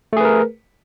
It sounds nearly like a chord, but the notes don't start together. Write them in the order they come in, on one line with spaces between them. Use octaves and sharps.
A3 G#4 B4 A#4